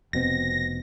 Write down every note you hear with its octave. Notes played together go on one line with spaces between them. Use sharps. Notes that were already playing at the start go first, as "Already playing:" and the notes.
F1 B2 C4 A#6